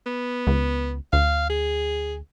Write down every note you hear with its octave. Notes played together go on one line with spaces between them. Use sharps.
B3
C#2
D2 F5
G#4